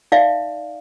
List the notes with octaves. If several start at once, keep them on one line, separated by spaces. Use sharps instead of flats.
D#4 D5 E5 F5